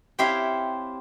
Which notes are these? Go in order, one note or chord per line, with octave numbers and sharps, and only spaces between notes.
C4 E4 G4 C#5 E5 F5